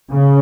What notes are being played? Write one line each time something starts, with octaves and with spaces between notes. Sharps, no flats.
C#3